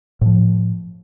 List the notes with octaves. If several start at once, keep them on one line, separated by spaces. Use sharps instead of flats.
A2 F3